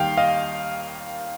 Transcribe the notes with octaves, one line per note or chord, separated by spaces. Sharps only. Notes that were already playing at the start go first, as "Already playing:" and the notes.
Already playing: D#2 D#3 G3 F5 G5
D#5 F5